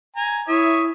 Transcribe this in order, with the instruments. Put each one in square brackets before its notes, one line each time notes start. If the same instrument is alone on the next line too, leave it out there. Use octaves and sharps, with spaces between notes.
[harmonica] G#5 A#5
[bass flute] E4 [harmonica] C#5 E5 D#6